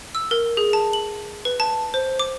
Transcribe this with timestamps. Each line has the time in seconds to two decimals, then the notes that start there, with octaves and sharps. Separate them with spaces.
0.15 E6
0.31 A#4
0.57 G#4
0.73 A5
0.93 F#7
1.45 B4
1.60 A5
1.94 C5
2.19 D6